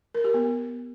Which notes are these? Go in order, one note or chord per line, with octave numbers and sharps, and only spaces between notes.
A#4
G4
B3